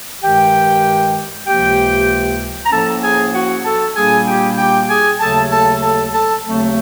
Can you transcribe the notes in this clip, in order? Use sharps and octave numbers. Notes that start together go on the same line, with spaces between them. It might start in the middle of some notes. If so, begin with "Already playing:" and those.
G2 D#3 G#3 G4 G5
C#2 C3 F3 A#3 G4 G5
A#5
A2 F3 A#3 C#4 A4 A5
G#4 G#5
F#4 F#5
A4 A5
A#2 G3 A#3 D4 G#4 G#5
G4 G5
G4 G5
G#4 G#5
D#2 C#3 F#3 A3 A4 A5
A4 A5
A4 A5
A4 A5
D#2 C#3 F#3 A3 C4